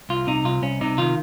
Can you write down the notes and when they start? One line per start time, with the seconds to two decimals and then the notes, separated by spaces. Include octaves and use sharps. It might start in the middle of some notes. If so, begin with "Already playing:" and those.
0.09 C2 F4
0.27 C3 D#4
0.45 C2 F4
0.62 C2 C#4
0.81 C3 D#4
0.98 D#3 F4